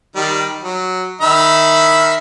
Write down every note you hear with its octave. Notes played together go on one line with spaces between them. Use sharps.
D#3 G3
F#3
D#3 E5 B5